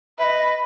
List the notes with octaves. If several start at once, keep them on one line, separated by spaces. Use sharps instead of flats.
B4 E5
D#5